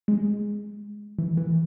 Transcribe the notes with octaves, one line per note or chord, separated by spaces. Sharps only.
G#3
E3
E3